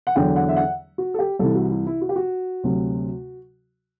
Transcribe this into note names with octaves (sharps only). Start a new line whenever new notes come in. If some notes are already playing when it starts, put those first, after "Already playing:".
F#5
E2 D3 F#3 G5
F#5
E5
F#5
F#4
A4
G4
C2 C3 E3 A4
F#4
E4
E4
F#4
G4
F#4
D2 C3 F#3